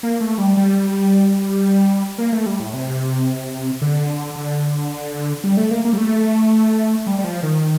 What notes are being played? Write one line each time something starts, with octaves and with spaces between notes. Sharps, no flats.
A#3
A3
G3
G3
A#3
A3
G3
A2
C3
D3
D3
G3
A3
A#3
A#3
G3
A3
G3
G3
F3
D#3